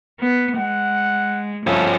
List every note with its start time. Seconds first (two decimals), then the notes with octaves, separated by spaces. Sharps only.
0.20 B3
0.57 G#3 F#5
1.67 G2 F3 A3 C#4 A4